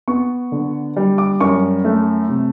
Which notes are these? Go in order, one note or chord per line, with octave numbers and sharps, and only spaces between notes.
B3 C#6
D3
G3
D6
F#2 C#6
A3
C3